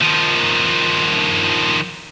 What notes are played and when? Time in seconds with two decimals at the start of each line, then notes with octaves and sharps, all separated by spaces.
0.01 D#3 F3